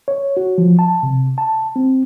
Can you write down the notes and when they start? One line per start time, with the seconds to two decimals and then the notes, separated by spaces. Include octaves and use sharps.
0.08 C#5
0.37 F#4
0.58 F3
0.79 A5
1.03 C3
1.38 A5
1.76 C4